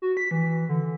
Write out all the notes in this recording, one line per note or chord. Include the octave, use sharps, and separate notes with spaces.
F#4
B6
E3
D3